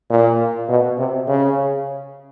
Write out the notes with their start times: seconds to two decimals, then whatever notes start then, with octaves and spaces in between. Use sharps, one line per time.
0.10 A#2
0.69 B2
0.98 C3
1.28 C#3